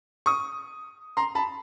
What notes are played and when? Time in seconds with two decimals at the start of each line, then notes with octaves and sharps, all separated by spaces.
0.26 C#6 D#6
1.17 A#5 C6
1.35 A5 B5